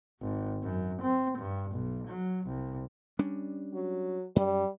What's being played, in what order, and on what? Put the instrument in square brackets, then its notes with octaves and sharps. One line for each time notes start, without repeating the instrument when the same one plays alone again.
[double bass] G#1
F#2
C4
G2
B1
F#3
C2
[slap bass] G3 C#4 D4
[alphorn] F#3
[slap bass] F#2 [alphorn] G3